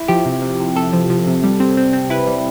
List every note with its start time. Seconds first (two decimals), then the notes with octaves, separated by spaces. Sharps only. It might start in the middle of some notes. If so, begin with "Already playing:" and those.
Already playing: E4
0.08 F3 G4
0.26 C3
0.42 C3
0.60 C3
0.76 C3 A4
0.93 F3
1.10 F3
1.27 C3
1.43 G3
1.60 C4
1.77 C4
1.93 C4
2.10 E4 B4
2.27 G3